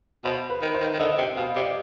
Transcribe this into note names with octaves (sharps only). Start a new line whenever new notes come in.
B2 C5
B4
D#3
C5
D#3
D#3
D3 D#5
C3 G5
B2 F5
C3 D5